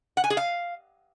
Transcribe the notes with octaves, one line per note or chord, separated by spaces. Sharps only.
F#5
G#5
G#4
F5